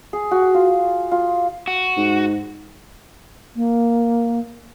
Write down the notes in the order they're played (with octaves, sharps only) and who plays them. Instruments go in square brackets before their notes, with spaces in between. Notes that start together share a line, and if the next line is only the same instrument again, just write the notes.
[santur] G#4
F#4
F4
F4
[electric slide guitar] F#4
[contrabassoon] G#2
[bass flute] A#3